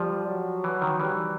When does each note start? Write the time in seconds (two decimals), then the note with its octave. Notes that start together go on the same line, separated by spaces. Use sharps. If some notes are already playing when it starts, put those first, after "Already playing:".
Already playing: F3 G3
0.28 F#3
0.64 E3
0.82 D#3
1.00 E3 G3